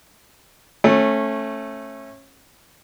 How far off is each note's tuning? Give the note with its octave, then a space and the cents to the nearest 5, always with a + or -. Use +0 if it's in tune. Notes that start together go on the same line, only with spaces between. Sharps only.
A3 +0 C#4 -25